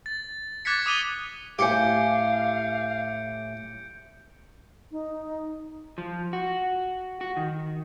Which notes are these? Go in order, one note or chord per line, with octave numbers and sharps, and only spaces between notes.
A6
D6 F#6 G#6 A6 B6 C#7
D6 D#6 B6 D#7 F7 G7
A2 G4 F5 G#5 G6 C#7 D7
D#4
F3
F#4
F#4
D#3